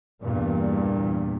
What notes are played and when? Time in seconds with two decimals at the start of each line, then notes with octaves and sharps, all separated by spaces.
0.21 E2 G2 A#2